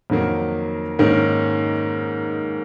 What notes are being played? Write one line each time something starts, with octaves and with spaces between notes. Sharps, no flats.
F2 D#3 F#3 A#3
G#2 D#3 A#3 C#4